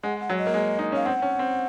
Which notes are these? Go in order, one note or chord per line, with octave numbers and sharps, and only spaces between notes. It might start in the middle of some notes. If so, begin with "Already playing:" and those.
G#3 F#5
F#5
F#3
D#5
A#3
G#3
D#4
C#4 F5
C4 F#5
C#4
C4